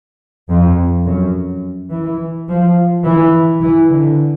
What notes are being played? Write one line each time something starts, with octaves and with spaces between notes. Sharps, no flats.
F2
F#2
E3
F3
E3
E3
D3